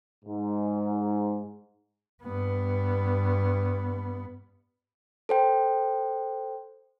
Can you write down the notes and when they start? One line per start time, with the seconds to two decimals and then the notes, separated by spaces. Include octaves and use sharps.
0.25 G#2
2.23 G2 B3
5.29 A4 C5 G5